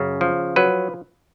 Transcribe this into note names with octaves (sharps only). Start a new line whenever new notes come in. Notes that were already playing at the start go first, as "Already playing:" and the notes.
Already playing: F#2 C#3
F3
F#3 B4